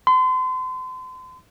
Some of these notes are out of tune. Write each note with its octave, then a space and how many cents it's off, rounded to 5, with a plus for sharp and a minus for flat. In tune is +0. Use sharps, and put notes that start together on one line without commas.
C6 -40